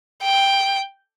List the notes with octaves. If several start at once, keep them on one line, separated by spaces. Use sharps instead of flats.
G5